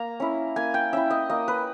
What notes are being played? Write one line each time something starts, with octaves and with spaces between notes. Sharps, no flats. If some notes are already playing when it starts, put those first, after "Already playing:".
Already playing: A#3 A#5
C#4 E4
A#3 G#5
G5
C#4 E4 E5
D#5
A#3 D#5
B4